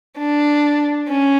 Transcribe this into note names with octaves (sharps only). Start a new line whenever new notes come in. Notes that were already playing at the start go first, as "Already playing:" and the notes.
D4
C#4